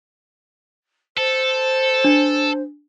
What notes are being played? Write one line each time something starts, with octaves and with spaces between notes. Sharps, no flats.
A4 C5
D4